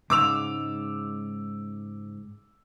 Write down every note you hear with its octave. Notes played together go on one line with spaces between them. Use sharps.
G#2 C#3 G#3 D6 E6 F7